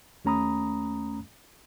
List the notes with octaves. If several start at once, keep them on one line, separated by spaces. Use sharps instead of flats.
D#2 A3 C#4 A#5 B5 D#6